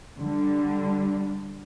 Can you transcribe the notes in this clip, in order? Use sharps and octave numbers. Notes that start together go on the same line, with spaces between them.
D3 G3